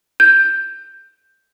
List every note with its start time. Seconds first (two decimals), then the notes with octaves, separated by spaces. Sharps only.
0.20 G6